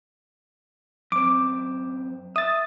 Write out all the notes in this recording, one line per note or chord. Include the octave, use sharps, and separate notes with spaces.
F#2 C4 D6
E5 D#6 A6